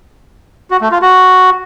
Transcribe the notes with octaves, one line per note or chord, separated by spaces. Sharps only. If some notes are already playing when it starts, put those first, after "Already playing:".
F#4
A3
F4
F#4